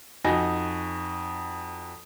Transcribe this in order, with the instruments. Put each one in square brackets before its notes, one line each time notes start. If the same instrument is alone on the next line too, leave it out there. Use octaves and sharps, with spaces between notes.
[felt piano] F2 D#4 F#4 G#5 A#6